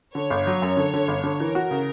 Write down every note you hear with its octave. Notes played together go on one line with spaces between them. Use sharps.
D3 C#5
G1
F#3
F#2
D3
D3
G1
D3
E3 A#4
F#4
C#3